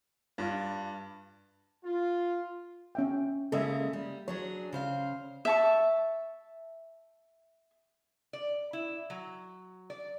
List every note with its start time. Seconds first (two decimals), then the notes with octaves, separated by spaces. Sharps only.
0.38 G2 D4 F4
1.85 F4
2.95 C#4 E5 G5
3.52 C#3 G#3 A#3 A4 D#5 E5
3.93 G3
4.28 F#3 D4 G#4 C#5
4.73 C#3 C5 F5
5.45 E5 A5 C#6
8.33 D5
8.73 E4
9.10 F#3
9.90 D5